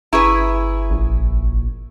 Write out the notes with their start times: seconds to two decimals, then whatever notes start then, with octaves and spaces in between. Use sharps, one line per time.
0.13 G1 E4 G#4 B4 A#5 C#6
0.91 A#1